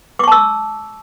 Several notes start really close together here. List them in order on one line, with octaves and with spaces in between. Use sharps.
D6 C#6 A5 E6